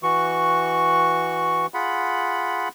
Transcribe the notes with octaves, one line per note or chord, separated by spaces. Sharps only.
E3 F#4 C#6
F4 G#4 F#5 B5